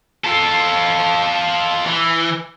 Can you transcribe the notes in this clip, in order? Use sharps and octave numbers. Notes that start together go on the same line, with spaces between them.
F4 A4
E3